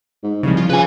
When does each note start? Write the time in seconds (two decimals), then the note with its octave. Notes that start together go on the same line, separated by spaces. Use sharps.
0.23 G#2
0.43 C2 C#3 F3
0.57 F4
0.69 C#3 B4 G#5